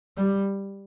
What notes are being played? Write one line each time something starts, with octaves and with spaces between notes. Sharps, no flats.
G3